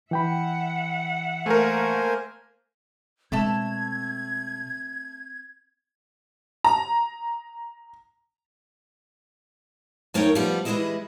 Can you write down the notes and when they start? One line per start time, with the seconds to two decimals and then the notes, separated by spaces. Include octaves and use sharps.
0.11 E3 E5 F#5 G5 B5
1.46 A3 A#3 A#4 C5 G#5
3.32 B2 G#3 A3 C4 E5 A5 G#6
6.64 A#5
10.14 F#2 A3 D#4 A#4 C#5 G5
10.35 F3 G3 B3
10.65 E3 G3 G#3 E4 D#5 E5